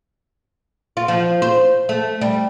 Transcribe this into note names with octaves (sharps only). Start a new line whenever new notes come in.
F4
F3
C5
A3
G3